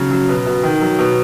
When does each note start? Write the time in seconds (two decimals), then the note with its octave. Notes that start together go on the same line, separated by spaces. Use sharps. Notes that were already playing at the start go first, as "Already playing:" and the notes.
Already playing: C#3 F#3
0.11 F#3
0.29 B2
0.46 B2
0.63 D#3
0.81 F#3
0.98 B2